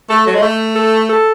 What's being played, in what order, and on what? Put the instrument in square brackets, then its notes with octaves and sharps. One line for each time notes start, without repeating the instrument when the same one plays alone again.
[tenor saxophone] A3 [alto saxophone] A4
[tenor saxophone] F#3
G#3
A3
[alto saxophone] A4
A4